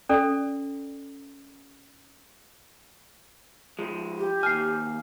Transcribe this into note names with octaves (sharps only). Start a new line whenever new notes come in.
C#4 A4 D5
F3 G#3
G4
D#2 G#5 F6 C7